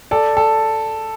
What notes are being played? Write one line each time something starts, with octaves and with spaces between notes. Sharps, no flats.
A4 D5
A4